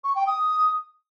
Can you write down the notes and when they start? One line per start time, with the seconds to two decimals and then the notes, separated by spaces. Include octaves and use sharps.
0.04 C#6
0.15 G5
0.27 D#6